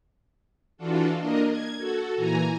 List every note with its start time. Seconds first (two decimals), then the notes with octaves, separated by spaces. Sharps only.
0.77 E3 D4 F4 F#4 A4
1.17 A#3 D4 A#4 D#5
1.49 G#6
1.78 F#4 A4
2.15 A#2 E3 G#5 A#5